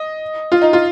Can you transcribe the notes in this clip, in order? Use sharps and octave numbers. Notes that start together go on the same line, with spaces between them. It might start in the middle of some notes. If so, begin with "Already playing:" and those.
Already playing: D#5
F4
D#4
F4